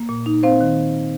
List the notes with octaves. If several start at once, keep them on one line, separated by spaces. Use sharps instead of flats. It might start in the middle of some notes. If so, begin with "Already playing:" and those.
Already playing: A#3
A#2
D#4
C4 C5 F5
D#3